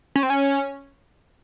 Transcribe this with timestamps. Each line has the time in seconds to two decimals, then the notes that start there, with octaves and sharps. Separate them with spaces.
0.16 C#4
0.23 C4
0.30 C#4